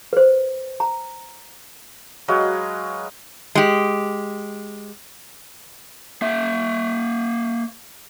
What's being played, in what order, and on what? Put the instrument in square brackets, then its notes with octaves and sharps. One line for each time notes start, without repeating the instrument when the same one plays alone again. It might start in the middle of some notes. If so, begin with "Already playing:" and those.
[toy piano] B4 C5
A#5
[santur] F#3 G#3 B4 F5
[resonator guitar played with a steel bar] G#3 G4
[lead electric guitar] A#3 E5